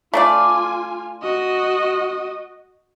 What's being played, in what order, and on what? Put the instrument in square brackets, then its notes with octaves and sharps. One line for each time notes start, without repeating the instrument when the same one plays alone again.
[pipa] A3 D4 D5 [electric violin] F4 G#5
[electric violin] F#4 D#5